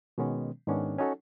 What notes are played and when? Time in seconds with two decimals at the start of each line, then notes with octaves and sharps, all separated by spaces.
0.18 B2 D#3 G#3 B3 C#4
0.67 G#2 D#3 B3 C#4 D4
0.98 C#4 D#4 F#4 A4